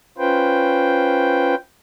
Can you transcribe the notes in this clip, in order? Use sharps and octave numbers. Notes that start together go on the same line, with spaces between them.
C#4 F4 B4 C5 G5